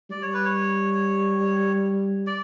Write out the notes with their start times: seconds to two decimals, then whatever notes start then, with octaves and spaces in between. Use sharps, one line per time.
0.10 G3 D5
0.22 C#5
0.34 B4
0.45 C#5
2.27 D5